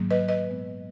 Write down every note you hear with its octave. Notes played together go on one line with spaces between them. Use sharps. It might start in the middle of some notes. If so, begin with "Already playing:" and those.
Already playing: G#2 D#3 F#3 A#3
B4 D#5
B4 D#5
A#2 G#3 B3